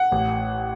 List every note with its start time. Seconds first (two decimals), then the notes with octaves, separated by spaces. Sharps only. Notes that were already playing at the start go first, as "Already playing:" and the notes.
Already playing: F#5
0.12 A1